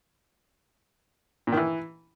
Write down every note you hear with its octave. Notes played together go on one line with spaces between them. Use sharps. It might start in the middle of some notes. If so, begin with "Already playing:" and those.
A#2
D#3
E3